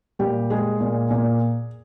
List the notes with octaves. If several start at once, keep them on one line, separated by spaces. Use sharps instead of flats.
A#2 G3 G4
G#3 G#4
A#2
A#2